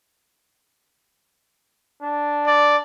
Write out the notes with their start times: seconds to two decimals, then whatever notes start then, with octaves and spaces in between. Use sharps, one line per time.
2.02 D4
2.47 D5